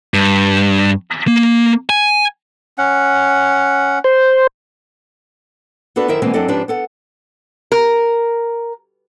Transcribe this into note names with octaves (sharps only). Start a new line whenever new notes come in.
G2
A#3
G#5
C#4 F#5
C5
B3 D4 F#4 A4 B4
F#2 D#3 E4 A#4 C5 E5
B2 D3 E3 G#3 A#3 C4
F#2 F#3 C4 D4 A4 D#5
G#2 F3 C#4 D4 G4 B4
B3 A4 F#5
A#4